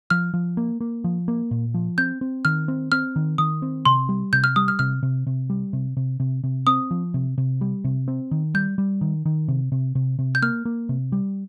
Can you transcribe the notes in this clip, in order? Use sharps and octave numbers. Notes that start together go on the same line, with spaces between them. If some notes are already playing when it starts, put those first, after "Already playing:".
F3 F6
F3
A#3
A#3
F3
A#3
A#2
F3
C4 G6
C4
D#3 F6
C4
C4 F6
D#3
D#3 D#6
C4
C3 C6
G3
C3 G6
F6
G3 D#6
F6
C3 F6
C3
C3
G3
C3
C3
C3
C3
C4 D#6
F3
C3
C3
G3
C3
C4
D#3
G3 G6
G3
D#3
D#3
C3
C3
C3
C3
G6
A#3 F6
A#3
C3
G3